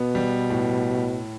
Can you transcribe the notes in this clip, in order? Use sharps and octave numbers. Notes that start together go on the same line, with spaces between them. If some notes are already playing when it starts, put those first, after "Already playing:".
Already playing: B2 B3
G3
A2